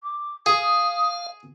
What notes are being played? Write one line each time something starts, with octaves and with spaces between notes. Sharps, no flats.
D6
G#4 F5 D#6